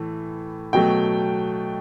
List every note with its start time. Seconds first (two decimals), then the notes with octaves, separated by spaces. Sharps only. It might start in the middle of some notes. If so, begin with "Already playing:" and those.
Already playing: A2 E3 A3
0.73 B2 F#3 A3 G5